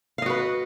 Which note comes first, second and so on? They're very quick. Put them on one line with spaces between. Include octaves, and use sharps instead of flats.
F5 D#5 F#4 B4